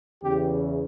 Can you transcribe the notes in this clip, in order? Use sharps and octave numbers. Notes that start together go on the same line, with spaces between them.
E2 C#3 E3 G4